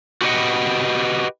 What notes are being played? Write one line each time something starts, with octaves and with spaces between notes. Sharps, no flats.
F#4 G4 B4 C#5 D#5 F#5